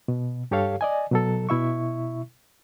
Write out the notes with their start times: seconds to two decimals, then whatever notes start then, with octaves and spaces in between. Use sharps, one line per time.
0.08 B2
0.51 G2 G4 A4 C#5 F5
0.81 D5 D#5 G#5
1.11 B2 F#3 A4
1.49 B2 E4 E5 C#6